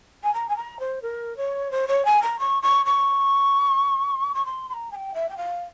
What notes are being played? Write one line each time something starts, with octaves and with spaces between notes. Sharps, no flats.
G#5
A#5
G#5
A#5
C5
A#4
C#5
C5
C#5
G#5
A#5
C#6
C#6
C#6
C#6
C6
C6
A#5
G#5
G5
E5
G5
F5